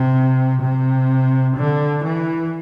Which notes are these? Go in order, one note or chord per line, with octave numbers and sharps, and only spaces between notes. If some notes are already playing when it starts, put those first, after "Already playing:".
Already playing: C3
C3
D3
E3